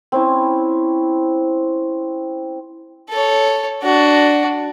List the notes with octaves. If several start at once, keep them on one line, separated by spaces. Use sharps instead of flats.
C4 C#4 E4
A4 C#5
D4 F#4